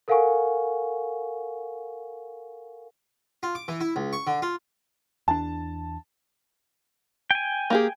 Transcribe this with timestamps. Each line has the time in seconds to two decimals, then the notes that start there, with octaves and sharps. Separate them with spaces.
0.08 A4 A#4 F5 F#5 G#5 C#6
3.43 F4
3.55 D6
3.68 E3
3.81 E4
3.96 C#2
4.13 C#6
4.27 D3
4.42 F4
5.28 E2 D4 A5
7.31 G5 G#5
7.70 A#3 G4 G#4